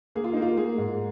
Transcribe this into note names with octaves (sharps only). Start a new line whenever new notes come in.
A#3 G#4
F4
A#3 D#4
F4
A#3 G#4
G#2